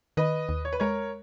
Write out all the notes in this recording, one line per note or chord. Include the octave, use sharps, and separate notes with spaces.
D#3 B4 D#5
D#2
C#5
B4
G#3 A#4 C#5